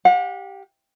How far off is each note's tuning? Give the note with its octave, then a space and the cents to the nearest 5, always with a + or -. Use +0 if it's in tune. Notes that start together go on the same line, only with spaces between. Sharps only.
G4 +0 F#5 -45